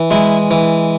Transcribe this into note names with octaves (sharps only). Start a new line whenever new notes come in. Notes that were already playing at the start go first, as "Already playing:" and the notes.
Already playing: E3
G#3 E4
E3